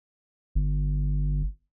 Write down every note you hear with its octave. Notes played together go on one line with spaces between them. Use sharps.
G1